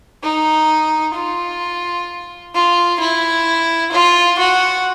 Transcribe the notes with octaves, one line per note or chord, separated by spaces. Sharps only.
D#4
F4
F4
E4
F4
F#4